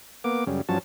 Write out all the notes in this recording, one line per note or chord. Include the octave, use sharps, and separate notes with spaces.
A#3 B3 D6
F#2 C#3 G3
G2 F3 F#3 C#4 A5